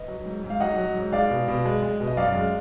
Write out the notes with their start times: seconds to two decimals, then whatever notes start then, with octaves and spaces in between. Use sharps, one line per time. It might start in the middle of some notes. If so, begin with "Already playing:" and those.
Already playing: B4 D#5
0.08 F#3
0.26 G#2
0.44 G#2
0.50 F5
0.60 F#3 D#5 F#5
0.78 F#3
0.95 G#2
1.12 G#3 D5 F5
1.30 B2
1.48 B2
1.66 G#3
1.83 G#3
2.00 B2
2.07 D#5
2.17 F#2 D5 F5
2.34 G#3